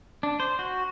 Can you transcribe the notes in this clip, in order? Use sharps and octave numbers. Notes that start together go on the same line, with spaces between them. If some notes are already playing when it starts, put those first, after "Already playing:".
D4
C5
F#4